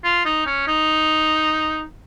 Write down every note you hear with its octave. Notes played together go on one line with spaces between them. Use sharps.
F4
D#4
C#4
D#4